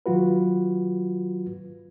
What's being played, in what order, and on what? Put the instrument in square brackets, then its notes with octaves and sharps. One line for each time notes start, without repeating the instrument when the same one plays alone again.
[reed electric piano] D#3 F#3 F4 F#4 B4